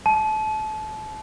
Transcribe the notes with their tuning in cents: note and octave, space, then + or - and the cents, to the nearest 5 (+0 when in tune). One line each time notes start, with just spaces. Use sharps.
A5 -30